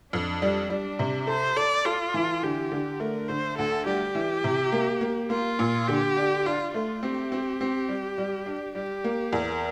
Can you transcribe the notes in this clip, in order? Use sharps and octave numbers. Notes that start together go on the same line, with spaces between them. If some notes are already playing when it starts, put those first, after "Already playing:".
F2 D4
G3
G3 D4
C3
A4 C5
A4 D5
F4 A4
E3
D3 G4
D3
A3 A#4
D3 C5
D2 A4
G3 G4
E3
C3
A#3
A#3
A#3 F4
A#2
D3 G4
D4
D4 F4
A3 F4
C4 G4
C4
C4
G3
G3
D4
G3 G4
A#3
E2 A#4